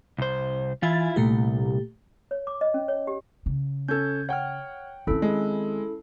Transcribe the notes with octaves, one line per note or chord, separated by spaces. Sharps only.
C2 C5
E3 E4 F4 G#5 A6
C2 A#2 A3 G4
C#5
D6
D#5
C#4
C#5
G4
C#3
C#4 A4 G6 G#6
C#5 F#5 G5 F6
D#3 C4 C#4 E4 A4
G#3